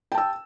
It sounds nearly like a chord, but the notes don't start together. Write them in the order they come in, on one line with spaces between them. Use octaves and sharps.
G5 A5 E6